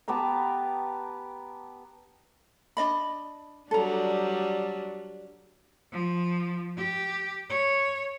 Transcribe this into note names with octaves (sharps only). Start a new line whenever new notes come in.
B3 G4 A5 A#5
D4 D#5 B5
F#3 G3 D4 A4 A#5
F3
G4
C#5